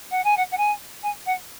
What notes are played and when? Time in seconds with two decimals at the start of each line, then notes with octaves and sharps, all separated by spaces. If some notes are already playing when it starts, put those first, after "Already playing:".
0.11 F#5
0.24 G#5
0.37 F#5
0.51 F#5
0.57 G#5
1.03 G#5
1.26 F#5